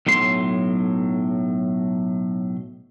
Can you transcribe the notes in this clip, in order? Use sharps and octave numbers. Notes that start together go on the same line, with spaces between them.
B1 A2 F#3 C6